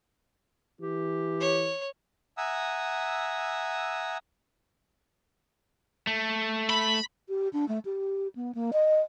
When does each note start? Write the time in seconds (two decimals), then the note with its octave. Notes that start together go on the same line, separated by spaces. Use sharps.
0.81 E3 G4
1.40 C#5
2.37 E5 F#5 G#5 A#5 D#6 E6
6.07 A3
6.70 B5
7.29 G4
7.53 D4
7.68 A3
7.85 G4
8.36 B3
8.55 A#3
8.73 D#5